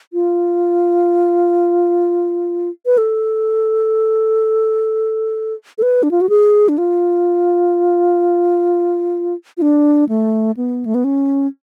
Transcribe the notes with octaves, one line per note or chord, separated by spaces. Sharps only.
F4
B4
A4
A4
B4
D4
F4
F#4
G#4
D4
F4
F4
D4
A3
B3
A3
B3
C#4